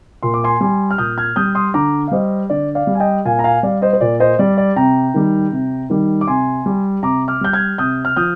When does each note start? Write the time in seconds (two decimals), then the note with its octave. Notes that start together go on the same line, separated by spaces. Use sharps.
0.23 A#2 C6
0.34 D6
0.44 G#5 C6
0.61 G3 G#5 C6
0.91 F6
0.98 A#2 D#6 G6
1.18 F6 G#6
1.36 G3 D#6 G6
1.55 C6 D#6
1.74 D3 A#5 D6
2.08 F5
2.11 G3 C5 D#5
2.50 D3 D5
2.75 D5 F5
2.87 G3
2.95 G#5
3.00 D#5 G5
3.25 A#2 F5 G#5
3.39 A#5
3.44 F5 G#5
3.63 G3 D5 F5
3.82 C5 D#5
3.93 C5
4.01 A#2 D5
4.20 C5 D#5
4.39 G3 D5
4.58 D5
4.76 C3 G5 A#5
5.14 D#3 G3
5.52 C3
5.90 D#3 G3
6.21 D6
6.27 C3 G#5 C6
6.66 G3
7.03 C3 A#5 D6
7.28 D6 F6
7.41 G3 G6
7.53 F6 G#6
7.78 C3 D#6 G6
8.05 F6
8.16 F3 D#6 G6